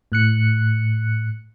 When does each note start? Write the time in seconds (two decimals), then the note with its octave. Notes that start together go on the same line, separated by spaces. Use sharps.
0.12 A2 F#6 C#7